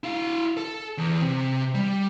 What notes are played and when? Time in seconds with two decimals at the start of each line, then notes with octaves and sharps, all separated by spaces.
0.04 E4 F5
0.57 A4
0.98 E2
1.22 C3
1.74 G3